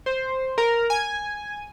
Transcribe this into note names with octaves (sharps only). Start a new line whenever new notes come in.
C5
A#4
G#5